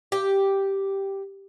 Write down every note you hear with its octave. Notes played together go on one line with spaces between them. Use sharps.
G4